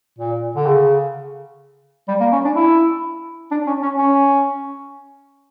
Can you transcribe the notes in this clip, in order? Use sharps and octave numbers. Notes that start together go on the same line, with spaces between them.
A#2
D3
C#3
G3
A#3
C#4
D4
E4
D4
C#4
C#4
C#4